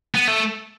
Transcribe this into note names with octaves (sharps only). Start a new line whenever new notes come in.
B3
A3